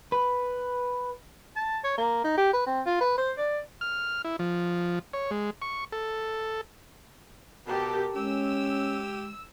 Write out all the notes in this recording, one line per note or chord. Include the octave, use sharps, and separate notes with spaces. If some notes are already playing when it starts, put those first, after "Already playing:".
B4
A5
C#5
A#3
D#4
G4
B4
C4
F4
B4
C5
D5
F6
E4
F3
C#5
G#3
C#6
A4
B2 G4 A4 A#4
G#3 C#4 G4 E6